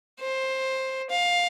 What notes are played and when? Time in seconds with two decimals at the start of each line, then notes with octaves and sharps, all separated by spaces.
0.20 C5
1.10 F5